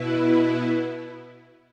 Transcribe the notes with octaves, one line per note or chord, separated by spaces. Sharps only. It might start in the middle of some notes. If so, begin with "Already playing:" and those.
Already playing: B2 B3 E4